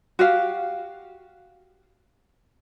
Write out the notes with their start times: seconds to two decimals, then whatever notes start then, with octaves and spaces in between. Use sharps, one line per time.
0.19 F#4 G4 F5